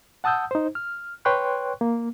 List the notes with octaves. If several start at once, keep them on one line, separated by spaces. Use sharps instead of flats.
F#5 A5 D#6 E6 G6
D#4 C5
F6
B4 C#5 G5 C6 C#6 F#6
A#3